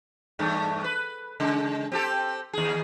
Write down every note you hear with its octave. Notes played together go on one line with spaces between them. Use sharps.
E2 G2 A3
B4
C#3 G#3
C4 G4 A4
D#2 G#4